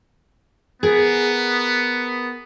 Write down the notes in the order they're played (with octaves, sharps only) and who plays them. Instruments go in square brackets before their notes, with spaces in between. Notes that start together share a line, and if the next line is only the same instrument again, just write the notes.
[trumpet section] B3 [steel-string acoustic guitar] G#4 A#4